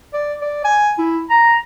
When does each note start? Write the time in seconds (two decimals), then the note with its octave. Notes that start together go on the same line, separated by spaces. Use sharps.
0.13 D5
0.41 D5
0.65 G#5
0.98 E4
1.30 A#5